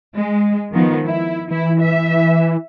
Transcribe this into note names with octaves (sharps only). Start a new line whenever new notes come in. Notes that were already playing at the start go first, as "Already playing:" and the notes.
G#3
D#3 F3 B3
E4
E3 E4
E5